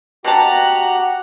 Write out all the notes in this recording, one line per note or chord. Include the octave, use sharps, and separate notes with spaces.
B2 F#4 G4 F#5 A5 A#5